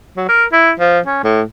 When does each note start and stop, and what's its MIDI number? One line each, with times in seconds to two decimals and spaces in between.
0.17 0.26 54
0.29 0.44 70
0.53 0.72 64
0.80 0.99 53
1.07 1.23 61
1.24 1.42 45